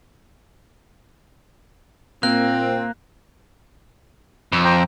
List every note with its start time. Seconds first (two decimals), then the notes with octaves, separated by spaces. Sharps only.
2.23 A#2 A#3 C4 F#6
4.52 F2
4.64 C5 G5 A#5